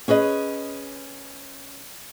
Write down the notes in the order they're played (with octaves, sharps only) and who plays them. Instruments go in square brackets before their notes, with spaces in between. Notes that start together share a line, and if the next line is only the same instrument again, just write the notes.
[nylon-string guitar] C#4 G#4 B4 D#5